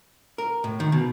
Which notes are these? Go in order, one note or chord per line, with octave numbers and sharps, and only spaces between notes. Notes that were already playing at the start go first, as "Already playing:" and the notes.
A#4
A2
D#3
B2